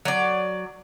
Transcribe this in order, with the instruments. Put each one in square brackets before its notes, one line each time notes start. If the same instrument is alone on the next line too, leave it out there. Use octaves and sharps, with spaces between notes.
[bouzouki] F#3 D5